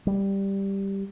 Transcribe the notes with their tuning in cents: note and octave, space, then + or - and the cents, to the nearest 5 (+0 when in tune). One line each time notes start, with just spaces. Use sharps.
G3 +0